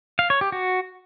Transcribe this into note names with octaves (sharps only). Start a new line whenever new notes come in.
F5
C#5
G4
F#4